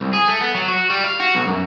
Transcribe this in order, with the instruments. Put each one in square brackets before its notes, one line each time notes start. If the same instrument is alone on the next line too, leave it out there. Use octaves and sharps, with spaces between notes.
[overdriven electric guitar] C2
G#4
A3
B3
F#3
F#4
G3
F5
F#4
B1
F#2